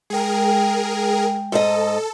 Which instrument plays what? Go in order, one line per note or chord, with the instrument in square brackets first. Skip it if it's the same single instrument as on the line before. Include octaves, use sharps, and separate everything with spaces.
[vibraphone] G#3 G5 [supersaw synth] G#4 A#4
[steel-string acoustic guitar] G#2 D#5 [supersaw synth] A4